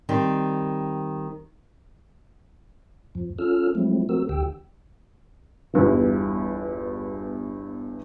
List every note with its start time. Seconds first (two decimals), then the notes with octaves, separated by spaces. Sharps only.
0.09 D#3 G3 C4
3.15 F2 F3
3.39 C#4 F4 A4 E6 F6
3.75 F3 F#3 G#3 A3 C4 E4
4.09 F3 A3 C4 F#4 A#4 E6
4.29 D2 D3 G4 G5 E6
5.73 G1 E2 G2 E3